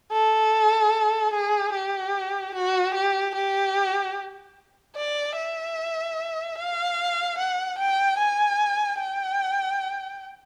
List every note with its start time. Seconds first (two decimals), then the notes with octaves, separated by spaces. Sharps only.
0.13 A4
1.33 G#4
1.74 G4
2.54 F#4
2.94 G4
3.35 G4
4.96 D5
5.37 E5
6.57 F5
7.38 F#5
7.78 G5
8.18 G#5
8.99 G5